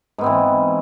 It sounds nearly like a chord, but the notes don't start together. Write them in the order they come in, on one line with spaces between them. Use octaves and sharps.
G#2 B3 C4 E3